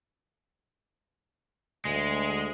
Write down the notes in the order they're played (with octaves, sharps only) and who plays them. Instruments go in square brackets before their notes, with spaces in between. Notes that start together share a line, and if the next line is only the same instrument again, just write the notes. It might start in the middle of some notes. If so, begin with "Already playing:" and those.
[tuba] D2 [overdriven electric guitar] G#3